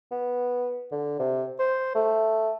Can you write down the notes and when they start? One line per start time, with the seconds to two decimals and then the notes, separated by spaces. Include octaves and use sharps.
0.11 B3
0.92 D3
1.20 C3
1.59 C5
1.95 A3